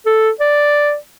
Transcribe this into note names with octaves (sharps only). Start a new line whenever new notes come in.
A4
D5